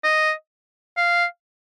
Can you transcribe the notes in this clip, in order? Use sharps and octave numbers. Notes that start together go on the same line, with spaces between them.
D#5
F5